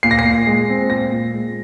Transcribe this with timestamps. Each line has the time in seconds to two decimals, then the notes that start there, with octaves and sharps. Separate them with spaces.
0.03 A#2 C7
0.11 A#6
0.19 C7
0.25 A#2
0.47 G#3
0.69 C4
0.90 A#2 A#6
1.11 A#2
1.34 G#3